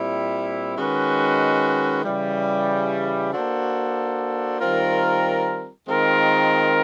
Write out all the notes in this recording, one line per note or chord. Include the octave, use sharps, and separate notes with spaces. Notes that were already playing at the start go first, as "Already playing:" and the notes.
Already playing: A#2 G3 C4 E4
D#3 G#3 C#4 F#4 B4
C#3 E3 G3
A#3 D4 F#4 A4 C5
D#3 G3 C4 F4 A#4
D#3 G#3 C4 F4 A#4